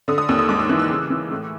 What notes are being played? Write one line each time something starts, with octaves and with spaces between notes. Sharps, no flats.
D3 D#6
D#6
D#2 E6
D#6
G#2 D6
E6
E3 F#6
E6
C#3
E3
A2